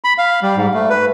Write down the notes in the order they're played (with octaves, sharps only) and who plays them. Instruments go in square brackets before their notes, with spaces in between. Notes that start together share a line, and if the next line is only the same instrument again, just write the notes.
[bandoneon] B5
F5
G3
G#2
A3
B4